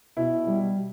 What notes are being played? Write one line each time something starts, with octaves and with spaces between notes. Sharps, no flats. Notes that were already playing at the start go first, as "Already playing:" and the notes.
B2 E4
G3